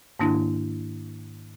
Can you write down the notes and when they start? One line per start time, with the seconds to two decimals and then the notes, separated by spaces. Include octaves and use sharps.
0.19 G#2 D#3 A#3 D4 E4